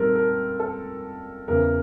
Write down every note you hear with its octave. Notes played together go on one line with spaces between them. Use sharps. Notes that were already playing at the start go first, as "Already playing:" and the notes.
Already playing: A#2 G3 C4 D#4 A4 A#4
A#4
A4
E2 C#3 E3 A#4